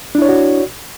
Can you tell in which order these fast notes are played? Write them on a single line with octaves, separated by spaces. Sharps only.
D4 E4 C#5 D5 F#4